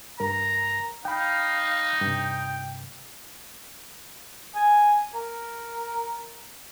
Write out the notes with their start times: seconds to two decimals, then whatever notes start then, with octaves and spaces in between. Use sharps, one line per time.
0.20 G2 A#4 A#5
1.05 D#4 F5 G5 B5
2.02 G2 C3 G5
4.55 G#5
5.15 A#4